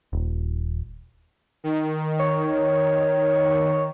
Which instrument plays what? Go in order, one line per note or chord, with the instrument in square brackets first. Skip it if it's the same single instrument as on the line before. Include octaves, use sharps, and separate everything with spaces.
[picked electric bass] D#1
[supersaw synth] D#3
[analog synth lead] C#5